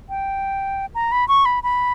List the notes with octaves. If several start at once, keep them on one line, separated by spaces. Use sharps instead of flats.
G5
A#5
B5
C#6
B5
B5